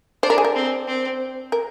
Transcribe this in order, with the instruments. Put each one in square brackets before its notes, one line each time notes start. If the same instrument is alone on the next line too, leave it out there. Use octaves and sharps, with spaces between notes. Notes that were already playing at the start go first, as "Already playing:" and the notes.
[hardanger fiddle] D4 [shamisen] C5
[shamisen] A#4
G#4
A#4
[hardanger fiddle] C4
C4
[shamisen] A#4